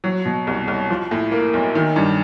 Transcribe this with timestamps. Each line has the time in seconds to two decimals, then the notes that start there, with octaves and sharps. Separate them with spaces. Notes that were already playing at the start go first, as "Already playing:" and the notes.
0.04 F#3
0.25 B2
0.47 C2
0.68 C2
0.90 F3
1.11 A2
1.31 A#3
1.54 B1
1.75 D#3
1.96 G2